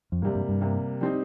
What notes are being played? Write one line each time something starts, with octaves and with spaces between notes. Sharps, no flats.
F2
G2 C3 G3 A#3
G2
G2
C3 G3 A#3
G3 C4 D#4